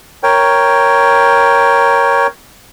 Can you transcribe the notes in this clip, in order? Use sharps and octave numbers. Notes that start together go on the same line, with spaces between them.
A#4 C#5 G5